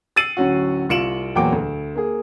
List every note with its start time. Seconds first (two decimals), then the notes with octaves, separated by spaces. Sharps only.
0.16 E6 A6 C7 C#7 D#7 F#7
0.37 D1 F#3 C#4 F#4
0.89 C2 F4 C#7 D7 E7 F#7
1.35 E2 A#2 F#3 G5 D6 D7
1.52 D2
1.95 A#3 G#4